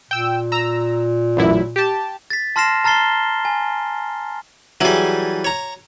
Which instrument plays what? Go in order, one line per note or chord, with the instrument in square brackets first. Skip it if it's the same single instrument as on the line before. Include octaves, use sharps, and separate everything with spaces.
[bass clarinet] A#2 [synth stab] G5 E6
[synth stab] A#5 E6
A1 F#2 E4
G4 A5
[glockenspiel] A6 B6
A5 C6 F6 A#6 C7 E7
A5 A#5 F6 A6 C7 G7
G#5
[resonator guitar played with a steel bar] E3 G3 [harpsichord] F#3 G#4
[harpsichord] C#5 A#5